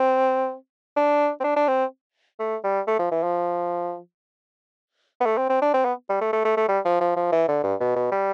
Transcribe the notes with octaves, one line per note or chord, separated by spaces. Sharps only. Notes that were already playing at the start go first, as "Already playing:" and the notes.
Already playing: C4
D4
C4
D4
D4
C4
A3
G3
A3
F3
E3
F3
B3
A3
C4
C4
D4
C4
B3
G3
A3
A3
A3
A3
G3
F3
F3
F3
E3
D3
G2
B2
B2
G3